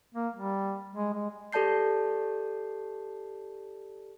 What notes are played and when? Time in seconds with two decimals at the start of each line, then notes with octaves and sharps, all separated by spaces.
0.15 A#3
0.34 G3
0.95 G#3
1.13 G#3
1.53 G4 A4 D5 A5 G6 C7